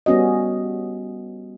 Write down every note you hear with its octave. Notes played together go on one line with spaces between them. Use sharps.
G3 B3 C#4 F#4 D#5